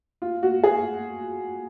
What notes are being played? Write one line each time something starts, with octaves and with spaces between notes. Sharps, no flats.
F4
F#4
G#4